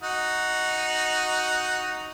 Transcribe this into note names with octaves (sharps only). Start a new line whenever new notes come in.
D#4 F#4